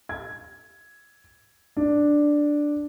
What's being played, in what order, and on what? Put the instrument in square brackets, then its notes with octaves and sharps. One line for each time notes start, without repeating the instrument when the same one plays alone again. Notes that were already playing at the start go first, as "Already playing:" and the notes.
[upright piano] G#6
D4